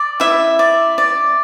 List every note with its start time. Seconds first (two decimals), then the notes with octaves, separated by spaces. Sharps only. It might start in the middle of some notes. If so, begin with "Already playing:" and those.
Already playing: D5
0.20 E4 E5
0.59 D5
0.98 D5